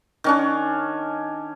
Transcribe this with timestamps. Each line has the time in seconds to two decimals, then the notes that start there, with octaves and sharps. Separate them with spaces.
0.24 D#3 C#4 D4